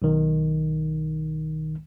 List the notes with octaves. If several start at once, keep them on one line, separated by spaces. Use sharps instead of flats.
B1 D#3